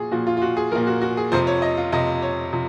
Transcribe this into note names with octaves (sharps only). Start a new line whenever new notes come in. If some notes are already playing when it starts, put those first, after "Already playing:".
Already playing: A#2 F3 F#4 G#4
A#2 F3 F#4
F4
F4
F#4
G#4
A#2 F3 A#4
F#4
F#4
G#4
F2 C3 F3 C5
C#5
D#5
F4
F2 C3 F3 D#5
C#5
C3 F3